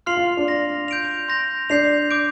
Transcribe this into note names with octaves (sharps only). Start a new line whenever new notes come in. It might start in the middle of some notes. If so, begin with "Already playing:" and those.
F4 C6 F6 C7 F7
F4
D4
C6 A#6 F7
G6 D7 F7
C6 G6 A#6 F7
D4 G6 C7 F7
D6 G6 D7